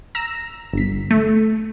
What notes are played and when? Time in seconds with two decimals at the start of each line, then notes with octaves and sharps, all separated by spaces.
0.15 A#5 E6
0.73 G1 B6
1.11 A3